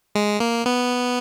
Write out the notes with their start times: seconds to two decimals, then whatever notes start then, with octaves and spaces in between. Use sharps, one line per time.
0.15 G#3
0.40 A#3
0.66 B3